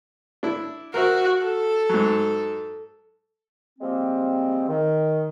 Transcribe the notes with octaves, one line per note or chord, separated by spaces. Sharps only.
D4 E4
F#4 A#4 C5 E5
A4
G#2 F#3
F3 G3 G#3 A#3 C4
D#3